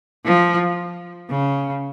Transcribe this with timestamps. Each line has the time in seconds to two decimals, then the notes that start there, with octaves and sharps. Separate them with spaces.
0.25 F3
1.30 C#3